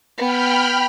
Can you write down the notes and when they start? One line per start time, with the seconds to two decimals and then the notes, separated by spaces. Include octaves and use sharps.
0.18 B3 G5 B5 F6